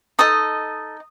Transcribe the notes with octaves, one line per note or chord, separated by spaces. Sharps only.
D#4 A4 D#5 D#6